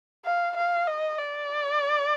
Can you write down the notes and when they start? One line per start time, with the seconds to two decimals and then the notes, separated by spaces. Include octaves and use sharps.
0.25 F5
0.57 F5
0.87 D#5
1.18 D5